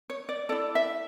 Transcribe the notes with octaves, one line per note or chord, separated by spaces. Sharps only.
C#5
D5
E4 A4 D5
E5